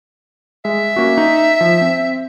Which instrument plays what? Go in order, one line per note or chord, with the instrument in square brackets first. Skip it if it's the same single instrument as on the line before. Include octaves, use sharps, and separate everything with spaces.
[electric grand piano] G#3 [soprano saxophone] E5
[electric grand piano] A#3 C#4 F#4
D#4
F3
C4